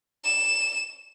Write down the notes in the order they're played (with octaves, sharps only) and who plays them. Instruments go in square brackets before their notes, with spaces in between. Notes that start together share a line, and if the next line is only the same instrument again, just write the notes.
[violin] E7